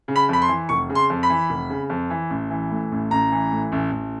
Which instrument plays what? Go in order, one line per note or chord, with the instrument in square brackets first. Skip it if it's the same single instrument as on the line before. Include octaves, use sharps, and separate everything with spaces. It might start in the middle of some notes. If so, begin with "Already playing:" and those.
[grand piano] C#3
B5
F2 B5
C6
E3
F1 C#6
C#3
C6
F2
B5
E3
F1
C#3
F2
E3
A1
E3
A2
A1
A1 A#5
E3
A2
A1
A1